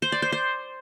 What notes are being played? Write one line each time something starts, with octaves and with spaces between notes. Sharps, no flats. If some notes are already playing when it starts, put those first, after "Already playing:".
C5
D5
C5
C5